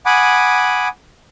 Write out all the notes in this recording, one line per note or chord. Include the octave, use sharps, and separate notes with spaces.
F#5 G#5 B5 D6 D#6